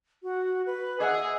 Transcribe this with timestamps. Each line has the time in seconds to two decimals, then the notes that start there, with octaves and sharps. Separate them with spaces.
0.23 F#4
0.66 B4
1.00 G#4 D#5 E5 F#5 G#5